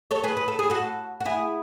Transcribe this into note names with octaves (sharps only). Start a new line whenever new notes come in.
A4 C#5
G#4 B4
B4
A4
G#4
F#4 A4
F#4
E4 G#4